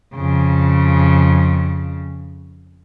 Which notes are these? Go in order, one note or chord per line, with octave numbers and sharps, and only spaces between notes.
F2 C#3